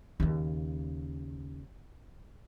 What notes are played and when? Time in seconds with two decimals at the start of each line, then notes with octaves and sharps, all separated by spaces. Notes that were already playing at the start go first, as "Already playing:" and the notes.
0.20 D#2 C#3